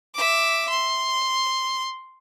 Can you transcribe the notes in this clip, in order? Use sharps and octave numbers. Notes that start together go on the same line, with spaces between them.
E5 D6
C6